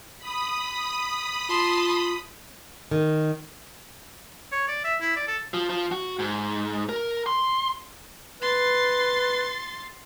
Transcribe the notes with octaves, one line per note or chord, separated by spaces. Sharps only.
B5 D#6
F4 A5 C6
D#3
C#5
D5
E5
E4
D5
A4
F3
F3
F#4
G#2
A#4
C6
B4 C6 A6